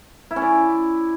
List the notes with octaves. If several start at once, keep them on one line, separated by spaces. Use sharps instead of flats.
E4
C#4
D5